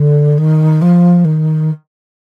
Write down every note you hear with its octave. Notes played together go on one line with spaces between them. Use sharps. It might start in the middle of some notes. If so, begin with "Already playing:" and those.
Already playing: D3
D#3
F3
D#3